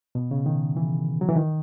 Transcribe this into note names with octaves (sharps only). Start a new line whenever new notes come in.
B2
C#3
D#3
E3
F#3
E3
D#3